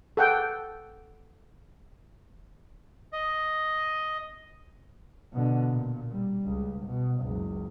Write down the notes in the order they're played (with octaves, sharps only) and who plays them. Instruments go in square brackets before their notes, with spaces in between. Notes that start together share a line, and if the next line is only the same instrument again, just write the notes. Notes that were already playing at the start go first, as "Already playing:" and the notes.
[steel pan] A4 F#5 G5
[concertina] D#5
[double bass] B2 D3
A#2
G3
C#2
B2
F#1 C#2